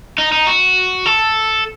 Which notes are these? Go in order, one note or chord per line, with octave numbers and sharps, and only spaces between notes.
D#4
D#4
F#4
A4